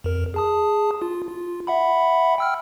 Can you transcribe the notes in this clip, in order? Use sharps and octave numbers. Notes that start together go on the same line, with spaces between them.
F2 A#4
G#4 A5 D#6
F4
F4
E5 F#5 B5
G5 E6 F6